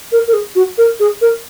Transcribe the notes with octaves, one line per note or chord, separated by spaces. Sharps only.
A#4
A#4
G#4
F#4
A#4
G#4
A#4